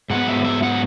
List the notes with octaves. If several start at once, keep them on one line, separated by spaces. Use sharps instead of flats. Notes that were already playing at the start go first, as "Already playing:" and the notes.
G#2 F#3 B3 F#5
E5
E5
F#5